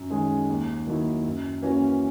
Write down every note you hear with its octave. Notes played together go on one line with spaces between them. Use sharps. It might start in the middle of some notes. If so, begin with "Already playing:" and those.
Already playing: F#2
D#3 G#3 C#4 G#4
D#2
D#3 F#3 A#3 E4
F#2
E3 A#3 C#4 F#4